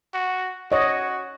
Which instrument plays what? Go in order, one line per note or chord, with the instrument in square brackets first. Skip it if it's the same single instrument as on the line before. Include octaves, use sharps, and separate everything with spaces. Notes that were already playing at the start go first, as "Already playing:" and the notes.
[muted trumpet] F#4
[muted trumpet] F#4 [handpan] C#5 D#5